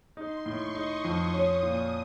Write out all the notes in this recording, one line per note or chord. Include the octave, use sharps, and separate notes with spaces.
D#4 C6
A2 C#6
D#4 D#6
F2 D#6
C#4 D#6
A#2 D#6